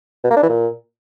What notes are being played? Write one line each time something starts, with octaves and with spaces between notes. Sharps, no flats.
B2
A#3
D4
E3
A#2